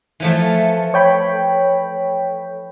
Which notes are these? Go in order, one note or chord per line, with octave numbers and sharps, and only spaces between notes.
E3 F3 A3
C#5 G5 B5